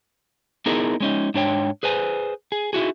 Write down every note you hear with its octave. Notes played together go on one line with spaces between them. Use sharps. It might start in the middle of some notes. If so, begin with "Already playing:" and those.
B3 D#4 E4 G#4 A#4
G#3 C#4 D#4
G#2 D4 C#5 G5
G#4 B4 C5 G#5
G#4
D#4 E4 F#4 G#4